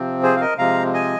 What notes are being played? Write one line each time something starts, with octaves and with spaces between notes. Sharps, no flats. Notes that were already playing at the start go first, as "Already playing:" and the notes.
Already playing: C3 F3 C4
G#4 C5
F5
A#4 D#5
C3 F3 G#3 F5 A#5
D#5 G#5